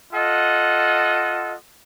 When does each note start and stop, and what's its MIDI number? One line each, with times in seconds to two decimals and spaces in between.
0.13 1.54 65
0.13 1.54 69
0.13 1.54 75
0.13 1.54 78